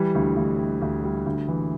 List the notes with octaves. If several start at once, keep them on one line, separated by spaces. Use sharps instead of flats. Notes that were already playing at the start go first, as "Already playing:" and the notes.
Already playing: E3 G3
D2
D2
G3
D2
G3
D2
E3